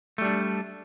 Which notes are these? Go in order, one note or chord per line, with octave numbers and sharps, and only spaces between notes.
G3 A3 D4